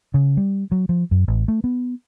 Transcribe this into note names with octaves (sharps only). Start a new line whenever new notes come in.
C#3
G3
F#3
F3
F#2
A1
A3
B3